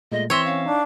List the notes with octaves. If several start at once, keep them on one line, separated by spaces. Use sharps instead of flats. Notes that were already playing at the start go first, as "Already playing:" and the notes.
A#2 G#3 A3 D#5
E3 C4 C#5 E5 C6 A#6
C#4 F5
D4 D#4